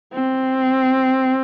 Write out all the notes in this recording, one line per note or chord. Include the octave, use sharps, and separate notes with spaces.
C4